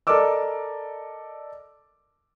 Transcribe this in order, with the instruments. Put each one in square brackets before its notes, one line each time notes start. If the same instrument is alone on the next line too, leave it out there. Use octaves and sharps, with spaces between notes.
[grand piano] A4 A#4 D5 D#5 D6 E6